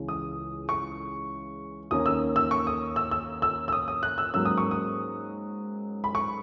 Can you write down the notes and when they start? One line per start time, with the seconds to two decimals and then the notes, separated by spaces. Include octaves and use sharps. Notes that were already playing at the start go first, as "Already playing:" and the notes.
Already playing: C#2 C#3 E3 G#3 C#4
0.08 D#6
0.69 C#6
1.91 D#2 D#3 A#3 C#4 D#6
2.06 E6
2.36 E6
2.51 C#6
2.67 D#6
2.96 E6
3.11 E6
3.42 E6
3.68 E6
3.72 D#6
3.88 D#6
4.03 F#6
4.18 E6
4.33 G#2 F#3 A#3 C#4 E6
4.45 D#6
4.58 C#6
4.71 D#6
6.04 B5
6.15 C#6